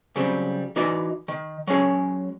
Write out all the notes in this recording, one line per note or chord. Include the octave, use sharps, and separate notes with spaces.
C#3 F#3 G3 C4
E3 D#4 F#4 B4 D5
D#3
F#3 G#3 C#4 G#4